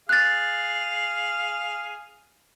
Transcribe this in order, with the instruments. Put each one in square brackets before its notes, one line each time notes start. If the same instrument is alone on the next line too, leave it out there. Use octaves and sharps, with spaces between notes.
[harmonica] G#4 F5 [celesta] F#6 A6